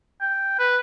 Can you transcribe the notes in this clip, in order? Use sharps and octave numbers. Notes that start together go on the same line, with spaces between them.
G5
B4